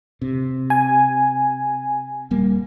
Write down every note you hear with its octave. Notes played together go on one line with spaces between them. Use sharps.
C3
G#5
D#1 G3 A#3